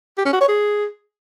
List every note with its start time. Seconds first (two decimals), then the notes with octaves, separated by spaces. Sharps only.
0.18 G4
0.25 C#4
0.33 F#4
0.41 C#5
0.48 G#4